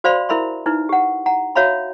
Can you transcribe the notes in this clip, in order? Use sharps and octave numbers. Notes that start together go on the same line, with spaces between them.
F#4 C5 D5 F5 B5 C6
E4 A#4 E5 B5 C6
D#4 E4 B4
G4 F#5
F#5 A#5
F#4 C#5 E5 F5 A#5 B5